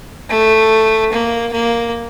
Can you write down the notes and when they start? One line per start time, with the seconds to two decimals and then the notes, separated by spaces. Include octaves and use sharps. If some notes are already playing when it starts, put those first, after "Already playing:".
0.29 A3
1.12 A#3
1.53 A#3